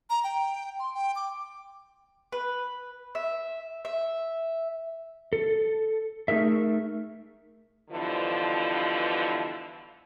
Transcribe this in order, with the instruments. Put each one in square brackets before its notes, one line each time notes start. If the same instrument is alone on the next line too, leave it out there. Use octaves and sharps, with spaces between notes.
[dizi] A#5
G5
C6
G5
D6
[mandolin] B4
E5
E5
[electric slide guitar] A4
A3 D#4 G#4 A#4 E5
[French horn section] G2 B2 D3 E3 F3